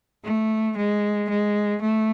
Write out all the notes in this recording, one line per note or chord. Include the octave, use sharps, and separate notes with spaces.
A3
G#3
G#3
A3